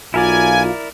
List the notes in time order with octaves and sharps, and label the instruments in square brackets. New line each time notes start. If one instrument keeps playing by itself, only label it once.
[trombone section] B1 F4 [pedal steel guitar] E4 A#4 D5 [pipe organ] G#5